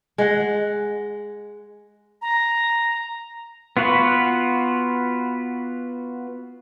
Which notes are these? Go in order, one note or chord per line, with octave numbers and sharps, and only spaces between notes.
G#3 F#5
A#5
B3 F4 F#4 B4